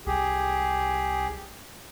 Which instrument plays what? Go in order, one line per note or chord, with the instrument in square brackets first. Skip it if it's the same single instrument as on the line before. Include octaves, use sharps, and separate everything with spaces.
[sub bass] C2 [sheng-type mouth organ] G4 G#4